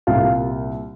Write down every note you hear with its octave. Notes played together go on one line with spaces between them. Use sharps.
C2 A#2 G3 F4